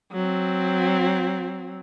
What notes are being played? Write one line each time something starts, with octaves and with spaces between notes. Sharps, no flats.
F#3 C4